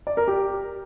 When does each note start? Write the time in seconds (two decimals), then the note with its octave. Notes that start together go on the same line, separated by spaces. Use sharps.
0.07 D5
0.17 A#4
0.28 G4